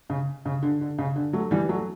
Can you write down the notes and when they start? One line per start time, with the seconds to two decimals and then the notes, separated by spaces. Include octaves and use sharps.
0.10 C#3
0.45 C#3
0.63 D3
0.81 D3
0.98 C#3
1.16 D3
1.33 F#3 A3
1.51 E3 G3
1.69 F#3 A3